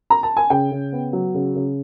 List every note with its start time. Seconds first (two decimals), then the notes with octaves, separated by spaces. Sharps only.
0.10 A#5
0.23 A5
0.37 G#5
0.50 C#3 G5
0.71 C#3
0.93 B3
1.13 F#3
1.34 C#3
1.55 C#3